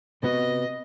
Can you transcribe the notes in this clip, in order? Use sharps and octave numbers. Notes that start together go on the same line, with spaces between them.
C3 B3 F#4 D#5